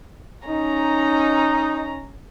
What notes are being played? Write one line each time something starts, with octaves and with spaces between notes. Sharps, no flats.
C#4 D#4 A#5